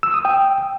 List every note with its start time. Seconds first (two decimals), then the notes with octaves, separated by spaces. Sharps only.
0.03 E6
0.14 D#6
0.25 G5